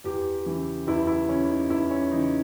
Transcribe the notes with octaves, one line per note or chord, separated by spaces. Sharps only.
E2 G4
C#3 E3
E2 E4
E4
C#3 E3 C#4
D#4
E2 E4
C#4
C#3 E3 D#4